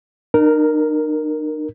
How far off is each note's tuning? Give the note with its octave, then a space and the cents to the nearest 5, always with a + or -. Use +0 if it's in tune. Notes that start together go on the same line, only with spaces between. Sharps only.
D#4 -45 A#4 +0